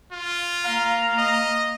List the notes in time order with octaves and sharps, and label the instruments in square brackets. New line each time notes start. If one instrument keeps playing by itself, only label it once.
[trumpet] F4
[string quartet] A#3 A#5 [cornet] F5
[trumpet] D#5